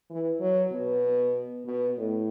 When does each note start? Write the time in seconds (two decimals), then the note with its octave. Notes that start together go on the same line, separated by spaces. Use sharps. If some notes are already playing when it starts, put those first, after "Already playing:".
0.10 E3
0.41 F#3
0.72 B2
1.65 B2
1.97 A2